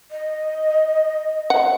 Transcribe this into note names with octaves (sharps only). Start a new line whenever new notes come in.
D#5
F#5